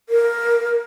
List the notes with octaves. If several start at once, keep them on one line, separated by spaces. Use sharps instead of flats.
A#4